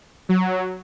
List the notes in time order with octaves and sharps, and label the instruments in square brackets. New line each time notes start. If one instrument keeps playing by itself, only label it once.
[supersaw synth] F#3